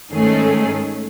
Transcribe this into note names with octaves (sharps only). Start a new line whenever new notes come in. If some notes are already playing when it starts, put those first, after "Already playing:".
G#2 D#3 A3 C#4 G#4